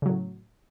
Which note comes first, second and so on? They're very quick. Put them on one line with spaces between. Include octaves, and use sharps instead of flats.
C#3 F#3 A2